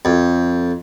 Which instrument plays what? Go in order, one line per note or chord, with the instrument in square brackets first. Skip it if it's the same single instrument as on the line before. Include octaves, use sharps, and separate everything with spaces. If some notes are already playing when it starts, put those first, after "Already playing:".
[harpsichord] F2